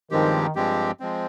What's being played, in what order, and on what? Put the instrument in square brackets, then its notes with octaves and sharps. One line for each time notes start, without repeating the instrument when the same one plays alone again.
[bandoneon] G2 F3 G#3 C4 G4 [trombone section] D#3
[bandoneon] G2 F3 G#3 C4 G4
F3 G#3 C4